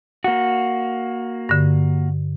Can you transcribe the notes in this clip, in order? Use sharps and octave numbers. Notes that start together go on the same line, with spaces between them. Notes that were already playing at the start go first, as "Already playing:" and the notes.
A#3 F#4
G2 D3